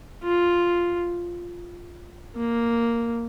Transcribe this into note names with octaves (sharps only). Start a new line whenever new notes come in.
F4
A#3